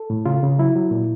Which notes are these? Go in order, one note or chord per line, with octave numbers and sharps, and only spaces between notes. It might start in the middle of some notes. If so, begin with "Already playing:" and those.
Already playing: A4
A2
C#3 F4
C#3
F#3 E4
F#3
A#2